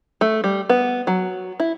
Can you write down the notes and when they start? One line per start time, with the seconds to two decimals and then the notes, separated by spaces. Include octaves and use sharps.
0.21 A3
0.44 G3
0.70 B3
1.07 F#3
1.60 E4